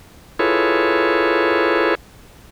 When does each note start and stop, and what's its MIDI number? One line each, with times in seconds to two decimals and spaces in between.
0.39 1.95 64
0.39 1.95 65
0.39 1.95 68
0.39 1.95 69
0.39 1.95 71
0.39 1.95 73